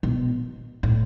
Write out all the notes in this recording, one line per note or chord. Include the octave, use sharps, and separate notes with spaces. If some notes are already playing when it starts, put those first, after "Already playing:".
B2
A2